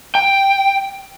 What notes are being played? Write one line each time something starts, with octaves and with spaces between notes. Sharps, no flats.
G5